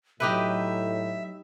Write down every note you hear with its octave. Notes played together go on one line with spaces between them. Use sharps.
A2 F#3 D#4 G4 B4 E5